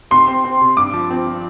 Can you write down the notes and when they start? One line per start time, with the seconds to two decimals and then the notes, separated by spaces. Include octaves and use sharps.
0.11 C3 C6
0.28 C4
0.44 C4
0.61 C3
0.77 G2 D6
0.93 F3
1.10 C4
1.27 F3